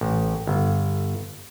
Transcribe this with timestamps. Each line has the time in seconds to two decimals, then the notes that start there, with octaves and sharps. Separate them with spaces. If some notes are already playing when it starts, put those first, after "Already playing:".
0.01 A1
0.47 G1